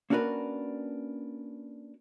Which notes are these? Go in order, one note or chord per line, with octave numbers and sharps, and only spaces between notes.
A#3 C#4 D4 F#4 A#4 B4